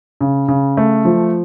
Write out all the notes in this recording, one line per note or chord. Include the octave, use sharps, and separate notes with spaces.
C#3
C#3
A3
F3